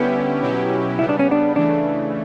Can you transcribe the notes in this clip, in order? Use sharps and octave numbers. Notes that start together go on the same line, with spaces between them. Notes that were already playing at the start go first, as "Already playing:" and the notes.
Already playing: D3 G3 B3 C#4 E4 G4
B2 F#3 C#4 E4 G4
C#3 G3 B3 E4
D4
C#4
D4
C#3 E3 A3 D4